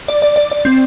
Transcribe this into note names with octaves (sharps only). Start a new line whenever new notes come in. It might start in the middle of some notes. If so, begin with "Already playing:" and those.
D5
D5
D5
D5
C4